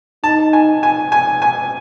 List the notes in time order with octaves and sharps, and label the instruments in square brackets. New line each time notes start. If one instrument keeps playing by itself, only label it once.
[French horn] D#4 [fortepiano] A5
[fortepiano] G#5
G#5
G#5
G#5